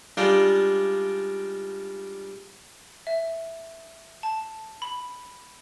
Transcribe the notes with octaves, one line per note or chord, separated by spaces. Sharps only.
G3 G#3 D4 D#4 F4
E5
A5
B5